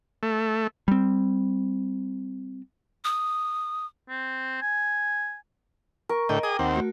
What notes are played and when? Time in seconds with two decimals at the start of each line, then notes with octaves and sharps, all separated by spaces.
0.23 A3
0.88 G3 C4
3.04 D#6
4.09 C4
4.62 G#5
6.09 A#4 C#6
6.29 A2 D3 D#5 G5
6.43 G#4 G5 D6 D#6
6.59 D#2 C4 F#5
6.74 A3 F#4